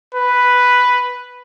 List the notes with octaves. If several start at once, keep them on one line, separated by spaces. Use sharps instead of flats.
B4